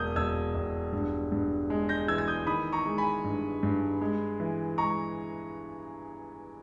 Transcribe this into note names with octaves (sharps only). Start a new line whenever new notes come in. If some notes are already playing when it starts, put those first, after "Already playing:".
Already playing: E1 A#3 D#6 G6
E1 E6 G#6
E1
G2
G2
G#3
G6 A#6
E3 E6 G#6
G#6
D#6 G6
D#3 B5 D#6
A#5 C#6
G#3
G#5 B5
G2
G2
G#3
E3
G#3 A#5 C#6